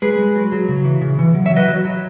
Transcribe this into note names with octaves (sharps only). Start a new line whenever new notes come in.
G#3 G#4 B4
G#3
F#3
F#3
C#3
E3
C#3
E3
F#3
C#5 E5
F#3
B4 D#5
F#3
F#3